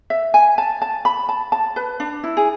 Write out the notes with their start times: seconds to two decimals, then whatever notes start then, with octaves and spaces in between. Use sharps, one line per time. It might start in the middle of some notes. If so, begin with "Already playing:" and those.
0.10 E5
0.34 G#5
0.58 A5
0.82 A5
1.05 B5
1.29 A5
1.52 A5
1.76 B4
2.00 D4
2.24 E4
2.37 G#4